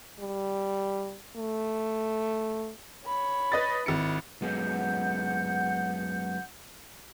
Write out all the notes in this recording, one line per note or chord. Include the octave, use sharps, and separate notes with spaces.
G3
A3
C#5 B5
B4 D#5 A6
G#1 E4 C#7
F#2 G#3 B3 F#5 G6